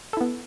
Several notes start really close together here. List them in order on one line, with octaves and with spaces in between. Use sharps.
A4 E4 B3